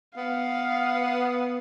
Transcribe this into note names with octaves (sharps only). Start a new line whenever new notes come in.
B3 F5